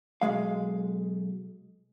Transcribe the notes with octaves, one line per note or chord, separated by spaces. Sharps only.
B1 F#2 G#3 F5